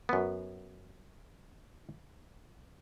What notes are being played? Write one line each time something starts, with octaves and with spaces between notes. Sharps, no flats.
F#2 B3